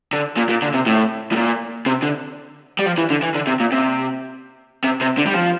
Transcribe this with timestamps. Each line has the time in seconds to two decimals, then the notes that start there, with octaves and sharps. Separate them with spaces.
0.13 D3
0.37 A#2
0.49 A#2
0.62 D3
0.74 C3
0.86 A2
1.32 A2
1.36 A#2
1.86 C3
2.03 D3
2.79 G3
2.86 F3
2.98 E3
3.10 D3
3.23 E3
3.35 D3
3.47 C3
3.60 A#2
3.72 C3
4.84 C3
5.01 C3
5.18 D3
5.26 G3
5.34 F3